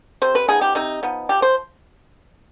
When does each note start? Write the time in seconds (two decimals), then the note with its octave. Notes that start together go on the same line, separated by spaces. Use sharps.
0.22 C3 C5
0.35 B4
0.48 F3 B3 D#4 G#4
0.61 G4
0.75 C3 D#4
1.03 F3 B3 D#4
1.29 F3 G4
1.42 C5